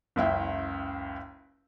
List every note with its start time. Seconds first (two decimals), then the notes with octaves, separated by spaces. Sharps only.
0.16 F#1 C#2 E4 G5